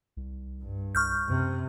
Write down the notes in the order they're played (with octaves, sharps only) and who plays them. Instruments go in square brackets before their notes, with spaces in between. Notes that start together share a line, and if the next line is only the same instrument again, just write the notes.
[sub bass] C2
[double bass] G2
[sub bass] C2 [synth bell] C#6 F6 G6
[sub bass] F#2 [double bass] C3